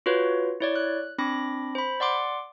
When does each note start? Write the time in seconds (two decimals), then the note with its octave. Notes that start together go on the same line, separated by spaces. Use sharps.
0.06 F4 F#4 B4 C#5
0.60 E4 C#5 D5
0.76 F#6
1.18 C4 D4 B5 D6 A#6
1.75 C5 B5
2.00 D5 F#5 C6 D6